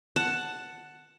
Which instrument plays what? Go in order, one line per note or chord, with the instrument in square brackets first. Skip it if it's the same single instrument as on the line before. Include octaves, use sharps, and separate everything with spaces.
[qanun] F#5 A5